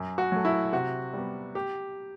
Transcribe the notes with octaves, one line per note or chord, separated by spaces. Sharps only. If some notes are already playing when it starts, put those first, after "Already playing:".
Already playing: F#2
F#4
F#3 A3
E4
C3 F#4
G3 B3
G4